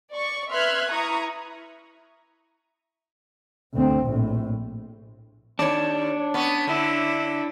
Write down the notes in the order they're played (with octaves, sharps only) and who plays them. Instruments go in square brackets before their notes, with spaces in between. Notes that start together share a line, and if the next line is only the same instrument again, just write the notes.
[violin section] D5 C#6
B4 E5 C6 F6 F#6 G#6
E4 A#5 C#6 D#6
[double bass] D2 C4
A#1 A2
[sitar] D#2 D5 [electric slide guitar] D4 C#5
[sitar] B3 C#4
[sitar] D3 [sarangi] E4